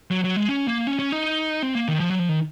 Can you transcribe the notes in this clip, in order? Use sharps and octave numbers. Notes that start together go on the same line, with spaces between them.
F#3
F#3
G#3
C#4
A#3
C#4
C#4
D#4
C4
A#3
D#3
F3
F#3
F3
D#3